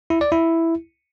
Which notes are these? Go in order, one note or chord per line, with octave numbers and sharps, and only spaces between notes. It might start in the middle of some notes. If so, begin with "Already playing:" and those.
E4
D5
E4